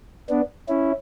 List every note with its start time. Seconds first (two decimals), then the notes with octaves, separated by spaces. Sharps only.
0.29 B3 D4
0.69 C#4 E4